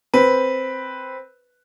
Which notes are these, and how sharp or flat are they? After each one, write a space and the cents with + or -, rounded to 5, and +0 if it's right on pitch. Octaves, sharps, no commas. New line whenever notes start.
C4 +0 B4 +0